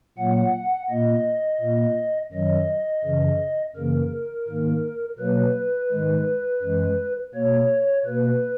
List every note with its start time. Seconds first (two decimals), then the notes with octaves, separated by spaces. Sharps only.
0.18 A#2 F#3 A#3 F#5
0.89 A#2 A#3 D#5
1.60 A#2 A#3
2.32 F#2 D#3 F#3 D#5
3.04 F#2 C#3 E3
3.75 F#2 C#3 E3 A#3 A#4
4.48 G#2 D#3 A#3
5.19 B2 F#3 A#3 B4
5.92 G#2 D#3 G#3
6.62 F#2 E3 G#3
7.34 B2 A#3 C#5
8.05 B2 A#3 B4